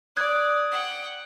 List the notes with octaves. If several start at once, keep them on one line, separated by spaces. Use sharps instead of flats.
D5 D#6 F#6 G#6
F#5 G5